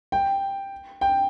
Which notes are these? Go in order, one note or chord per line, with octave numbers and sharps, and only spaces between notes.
G5
G5